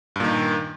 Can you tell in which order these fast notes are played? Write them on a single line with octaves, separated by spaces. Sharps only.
G2 A#2 D#3